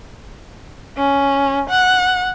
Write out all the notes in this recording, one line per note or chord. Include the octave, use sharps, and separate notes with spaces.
C#4
F#5